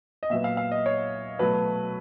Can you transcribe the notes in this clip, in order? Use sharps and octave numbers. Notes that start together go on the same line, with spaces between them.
D#5
A#2 F#3 B3 E5
F5
F5
D#5
C#5
B2 F#3 A3 B4